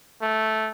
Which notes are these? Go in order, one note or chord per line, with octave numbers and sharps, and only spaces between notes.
A3